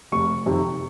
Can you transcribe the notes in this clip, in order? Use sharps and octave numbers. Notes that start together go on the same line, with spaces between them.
F1 C#6
F2 C3 D#3